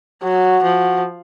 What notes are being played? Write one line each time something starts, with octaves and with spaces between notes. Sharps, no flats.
F#3 F#4
F3